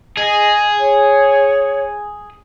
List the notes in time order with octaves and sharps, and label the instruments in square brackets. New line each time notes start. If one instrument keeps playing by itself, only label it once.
[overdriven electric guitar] G#4 [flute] D#5
[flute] C#5